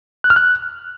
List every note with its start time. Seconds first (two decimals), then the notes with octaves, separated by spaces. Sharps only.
0.24 F#6
0.30 F6
0.36 F#6